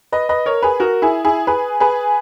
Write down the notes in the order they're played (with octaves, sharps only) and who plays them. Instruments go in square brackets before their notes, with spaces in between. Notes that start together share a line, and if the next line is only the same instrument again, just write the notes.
[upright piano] B4 D#5
B4 D#5
A#4 C#5
G#4 B4
F#4 A#4
E4 G#4
E4 G#4
G#4 B4
G#4 B4